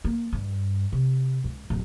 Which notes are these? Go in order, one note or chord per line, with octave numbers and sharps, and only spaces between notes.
A#3
G2
C3
C#2
D1